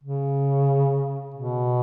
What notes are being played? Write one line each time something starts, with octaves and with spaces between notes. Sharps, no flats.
C#3
B2